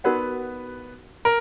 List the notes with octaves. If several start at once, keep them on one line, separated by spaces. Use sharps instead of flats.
B3 D#4 F#4 A#4 B4 D5 F#5
A#4